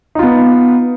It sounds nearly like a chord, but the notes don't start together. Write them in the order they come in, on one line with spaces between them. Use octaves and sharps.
D#4 F4 B3